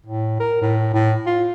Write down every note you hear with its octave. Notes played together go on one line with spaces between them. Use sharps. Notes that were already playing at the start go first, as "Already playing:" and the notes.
A2
A#4
A2
A2
F4